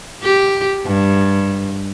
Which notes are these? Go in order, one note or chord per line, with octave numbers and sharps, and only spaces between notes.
G4
G2